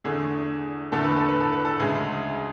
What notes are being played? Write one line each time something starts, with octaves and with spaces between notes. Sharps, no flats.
E2 D3 A3 G#4
E2 D3 A3 A4
B4
A4
B4
A4
B4
A4
D2 C#3 G#3 G#4